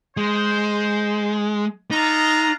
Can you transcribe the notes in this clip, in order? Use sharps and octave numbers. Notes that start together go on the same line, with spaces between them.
G#3 C5
D4 D#4 F4 A#5